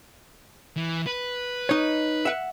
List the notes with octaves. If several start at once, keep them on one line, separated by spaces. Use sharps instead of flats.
E3
B4
D#4 C#5
E5 F#5